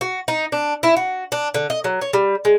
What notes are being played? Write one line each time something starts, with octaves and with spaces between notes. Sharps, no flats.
F#4
D#4
D4
E4
F#4
D4
D3
D#5
F#3
C#5
G3
G#3